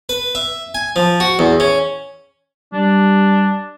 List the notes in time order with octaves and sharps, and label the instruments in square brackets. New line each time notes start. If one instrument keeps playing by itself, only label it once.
[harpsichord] B4
E5
G#5
F3
F#4
E2
C#4
[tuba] G3 [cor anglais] D4